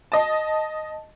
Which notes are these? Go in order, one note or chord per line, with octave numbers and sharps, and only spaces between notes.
D#5 A5